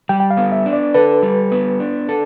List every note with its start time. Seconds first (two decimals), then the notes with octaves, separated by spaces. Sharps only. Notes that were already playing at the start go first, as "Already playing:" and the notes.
0.09 G3 G5
0.20 G5
0.31 F5
0.37 B3
0.52 E5
0.66 D4
0.73 D5
0.94 A4 B4
1.23 G3
1.52 B3
1.80 D4
2.09 A4